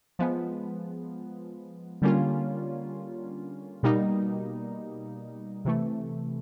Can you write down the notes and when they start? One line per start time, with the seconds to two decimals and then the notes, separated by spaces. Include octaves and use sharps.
0.19 F3 G#3 B3
2.02 D3 G3 A#3 C#4 F4
3.83 B2 G3 A#3 D#4
5.65 C3 E3 A3